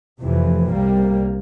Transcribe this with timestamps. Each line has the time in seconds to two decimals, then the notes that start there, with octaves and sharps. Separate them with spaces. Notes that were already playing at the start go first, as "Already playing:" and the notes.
0.22 F1 F2 C3 E3
0.71 C2 C3 G3 A#3